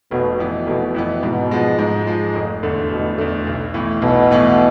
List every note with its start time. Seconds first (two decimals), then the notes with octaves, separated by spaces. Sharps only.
0.11 F1 B2
0.39 F2 E3 B3
0.67 F1 B2
0.95 F2 E3 B3
1.23 G#2 B2
1.51 F3 G#3
1.79 G#2
2.07 F3 G#3
2.35 F1
2.63 E2 D3 A3
2.91 F1 B2
3.18 E2 D3 A3
3.47 B1
3.74 A2 E3 B3
4.02 B1 B2
4.30 A2 E3 B3